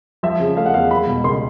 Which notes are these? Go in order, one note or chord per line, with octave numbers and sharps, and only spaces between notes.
F3 E5
C#3
A3 F5
F#5
E2 F5
G#3 B5
B2
C#2 C6